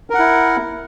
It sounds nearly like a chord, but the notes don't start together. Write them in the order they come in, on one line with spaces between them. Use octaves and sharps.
A#4 F#5 E4